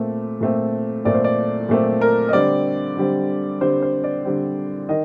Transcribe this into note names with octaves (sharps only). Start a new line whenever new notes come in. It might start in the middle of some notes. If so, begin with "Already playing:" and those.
Already playing: A#2 A3 C4
A#2 A3 C4
A#2 A3 C4 D5
C5
D5
A#2 A3 C4
A#4
D#5
D3 G3 C4 D5
D3 G3 C4
D3 G3 C4 C5
C5
D5
D3 G3 C4
D#3 D#5